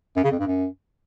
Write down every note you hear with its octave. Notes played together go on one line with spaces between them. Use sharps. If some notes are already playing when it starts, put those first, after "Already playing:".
F#2
C#3
F2
G2
F#2